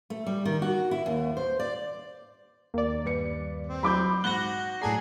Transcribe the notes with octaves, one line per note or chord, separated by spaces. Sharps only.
A3
G3
D#3
F#4
E4
D#2
C5
D5
D#2 D5
G2 B4 C#7
C4
F#3 B5 D6 G6
G#2 F#4 F#6 A#6 G7
A2 F#3 D4 G#4 A5 A#5 C7